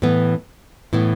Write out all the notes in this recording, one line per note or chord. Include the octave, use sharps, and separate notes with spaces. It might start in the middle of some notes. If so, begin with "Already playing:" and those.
A2 E3 B3
A2 E3 B3